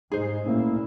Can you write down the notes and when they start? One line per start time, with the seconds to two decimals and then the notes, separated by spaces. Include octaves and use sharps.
0.12 G#2 G#3 D#4 G#4 C5
0.46 A#2 A3 A#3 C#4 E4